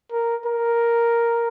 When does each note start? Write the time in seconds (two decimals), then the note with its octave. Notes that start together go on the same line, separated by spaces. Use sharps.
0.12 A#4
0.46 A#4